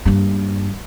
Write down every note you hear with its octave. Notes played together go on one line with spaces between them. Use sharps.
G2 A#3